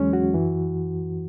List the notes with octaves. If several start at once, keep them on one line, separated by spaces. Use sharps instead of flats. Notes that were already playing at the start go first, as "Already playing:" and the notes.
Already playing: E2 E3 F#3 G#3 C#4
F#4
F#2 E3